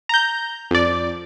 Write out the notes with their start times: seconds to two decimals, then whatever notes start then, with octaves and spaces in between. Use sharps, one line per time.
0.09 A#5 G6
0.71 F2 D5